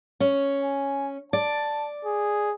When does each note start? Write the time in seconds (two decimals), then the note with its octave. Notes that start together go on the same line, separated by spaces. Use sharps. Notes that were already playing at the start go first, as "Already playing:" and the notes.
0.20 C#4
0.63 G#5
1.33 D5 A5
2.05 G#4